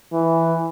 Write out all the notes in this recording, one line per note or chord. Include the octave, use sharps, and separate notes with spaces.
E3